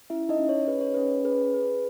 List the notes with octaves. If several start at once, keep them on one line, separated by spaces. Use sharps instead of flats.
C#4 E4 E5
D#4 D#5
C#4
C#5
G#4 B4
C#5
C#4 B4
G#4 B4
G#4 B4